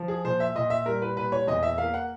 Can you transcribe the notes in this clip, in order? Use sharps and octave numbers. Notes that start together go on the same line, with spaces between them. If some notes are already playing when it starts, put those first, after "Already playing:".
Already playing: F3
G#4
A#2 C5
E5
A#2 D#5
E5
G3 A#4
B4
A#2 B4
C#5
E2 D#5
E5
A#3 F5
F#5